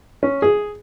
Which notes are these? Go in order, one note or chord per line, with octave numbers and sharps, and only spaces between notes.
C#4
G#4